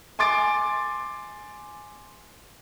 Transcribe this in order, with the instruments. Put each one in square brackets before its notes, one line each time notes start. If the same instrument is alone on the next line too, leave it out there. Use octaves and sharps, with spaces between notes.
[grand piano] G#5 C6 D6 A6 D7